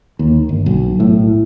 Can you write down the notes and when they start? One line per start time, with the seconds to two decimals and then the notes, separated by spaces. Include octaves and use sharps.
0.19 D#2
0.49 G1
0.66 B1
1.00 A2